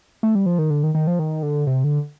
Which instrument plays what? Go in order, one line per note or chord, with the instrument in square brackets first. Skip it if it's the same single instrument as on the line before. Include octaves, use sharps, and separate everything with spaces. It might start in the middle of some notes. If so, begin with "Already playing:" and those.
[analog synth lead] A3
G3
F3
D#3
D3
D#3
D#3
F3
D#3
D3
C3
D3